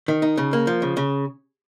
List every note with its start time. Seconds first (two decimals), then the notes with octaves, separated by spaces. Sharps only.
0.08 D#3
0.22 D#4
0.37 C#3
0.53 A#3
0.67 F3
0.82 C#3
0.97 C#3